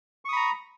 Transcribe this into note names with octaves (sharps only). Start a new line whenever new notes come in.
A#5 B5 C#6 D#6